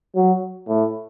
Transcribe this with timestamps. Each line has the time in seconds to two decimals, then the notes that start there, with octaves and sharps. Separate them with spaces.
0.16 F#3
0.68 A2